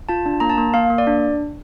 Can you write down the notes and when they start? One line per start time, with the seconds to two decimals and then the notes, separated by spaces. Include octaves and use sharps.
0.09 F4 A5
0.26 D4
0.40 A#3 A#5
0.50 A5
0.58 A#3
0.74 A#3 F5
0.90 A#3
0.98 D5
1.07 D4